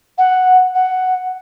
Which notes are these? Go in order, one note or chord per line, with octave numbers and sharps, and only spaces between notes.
F#5
F#5